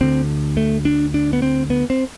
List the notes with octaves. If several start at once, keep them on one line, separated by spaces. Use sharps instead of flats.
D2 D3 C4
A3
D4
D4
B3
C4
B3
C4